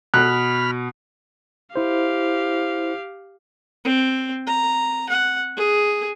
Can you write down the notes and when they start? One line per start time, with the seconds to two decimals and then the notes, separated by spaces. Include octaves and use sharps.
0.14 B2 B5 F6 F#6
1.76 E4 G4 C5 F5
3.84 C4
4.47 A#5
5.09 F#5
5.56 G#4